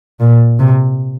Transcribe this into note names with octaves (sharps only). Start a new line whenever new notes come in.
A#2
C3